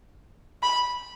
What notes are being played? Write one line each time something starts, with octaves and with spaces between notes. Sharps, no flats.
B5